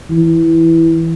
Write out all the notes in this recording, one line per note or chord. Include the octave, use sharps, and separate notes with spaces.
E3